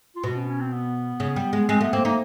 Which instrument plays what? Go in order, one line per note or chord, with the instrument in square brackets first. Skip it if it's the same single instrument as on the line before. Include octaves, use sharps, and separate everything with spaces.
[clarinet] F4
[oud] B2 [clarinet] F#4
[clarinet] C#4
C#4
C4
B3
[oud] C#3
G3
G#3
[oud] G#3 [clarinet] C4
[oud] A3 [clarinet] B3
[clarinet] A#3 [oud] C4
[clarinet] A#3 [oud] D#4